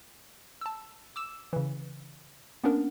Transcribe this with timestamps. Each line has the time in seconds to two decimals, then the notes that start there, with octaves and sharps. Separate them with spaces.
0.61 A5 E6
1.16 D6 E6 E7
1.53 C#3 E3
2.64 A#3 B3 C#4 D4 A#4